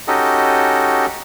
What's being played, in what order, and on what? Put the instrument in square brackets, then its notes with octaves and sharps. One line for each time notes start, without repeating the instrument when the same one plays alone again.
[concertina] C#4 D#4 F#4 G4 A4 D#5